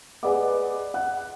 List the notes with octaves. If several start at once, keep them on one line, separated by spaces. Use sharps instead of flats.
G#4 B4 D5 D#5 F#5 D6
F#5 F#6